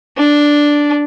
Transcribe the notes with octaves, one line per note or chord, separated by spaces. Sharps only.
D4